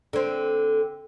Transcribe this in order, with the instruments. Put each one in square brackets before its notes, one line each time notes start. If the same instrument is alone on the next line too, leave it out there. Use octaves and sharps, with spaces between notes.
[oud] D3 C4